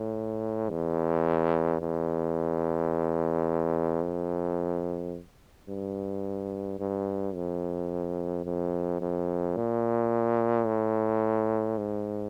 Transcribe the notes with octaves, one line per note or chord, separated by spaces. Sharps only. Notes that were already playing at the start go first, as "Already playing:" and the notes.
Already playing: A2
E2
E2
F2
G2
G2
F2
F2
F2
A#2
A2
G#2